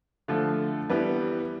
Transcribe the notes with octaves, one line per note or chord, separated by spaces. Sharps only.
D3 F3 A3
E3 G3 B3